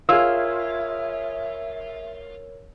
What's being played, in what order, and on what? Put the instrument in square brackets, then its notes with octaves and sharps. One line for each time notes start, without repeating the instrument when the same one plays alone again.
[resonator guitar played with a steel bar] F4 [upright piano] G#4 E6 [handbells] A#4 C#5 [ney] E5